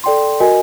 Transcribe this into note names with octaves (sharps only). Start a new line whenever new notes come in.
A4 D5 G5 C6
F#4 A#4 D#5 G#5